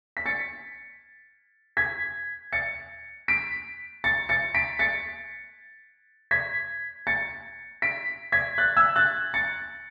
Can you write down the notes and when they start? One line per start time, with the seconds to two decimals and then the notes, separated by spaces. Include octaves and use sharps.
0.17 B6
0.26 A6 C#7
1.77 G#6 B6
2.53 A6 C#7
3.28 B6 D7
4.04 A6 C#7
4.29 A6 C#7
4.55 B6 D7
4.79 A6 C#7
6.31 G#6 B6
7.07 A6 C#7
7.82 B6 D7
8.32 G#6 B6
8.58 F#6 A6
8.77 E6 G#6
8.96 F#6 A6
9.34 A6 C#7